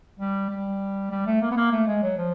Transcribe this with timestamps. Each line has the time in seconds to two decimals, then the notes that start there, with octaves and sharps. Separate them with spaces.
0.19 G3
0.50 G3
1.11 G3
1.26 A3
1.41 A#3
1.50 B3
1.56 A#3
1.72 A3
1.87 G#3
2.02 F#3
2.18 F3